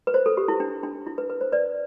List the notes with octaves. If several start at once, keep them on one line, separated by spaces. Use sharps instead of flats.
B4
C5
A4
G4
E4
D4
D4
E4
B4
B4
C5
B4 D5